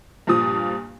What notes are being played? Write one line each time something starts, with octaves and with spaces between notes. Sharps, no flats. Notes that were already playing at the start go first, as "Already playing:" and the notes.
G2 A#2 F3 D#6